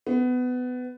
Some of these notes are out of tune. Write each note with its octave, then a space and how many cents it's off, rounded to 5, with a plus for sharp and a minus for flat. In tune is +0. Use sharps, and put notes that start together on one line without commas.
B3 +20